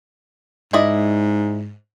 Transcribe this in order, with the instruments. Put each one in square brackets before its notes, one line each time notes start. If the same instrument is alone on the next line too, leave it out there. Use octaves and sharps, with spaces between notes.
[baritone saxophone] G#2 [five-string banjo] E4 D5 D#5